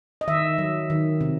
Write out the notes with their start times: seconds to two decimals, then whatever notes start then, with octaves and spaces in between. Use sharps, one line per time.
0.21 D#5
0.28 D#3 E5
0.58 F#3
0.90 D#3
1.21 C3